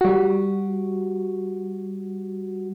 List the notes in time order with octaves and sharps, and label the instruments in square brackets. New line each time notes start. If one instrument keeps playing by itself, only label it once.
[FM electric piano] G3 F#4